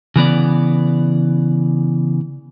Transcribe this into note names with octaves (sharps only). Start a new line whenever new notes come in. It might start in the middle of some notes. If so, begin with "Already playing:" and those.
C#3 E3 B3 D5